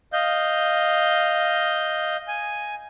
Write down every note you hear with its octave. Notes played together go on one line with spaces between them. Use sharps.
D#5 F5 G6
G#5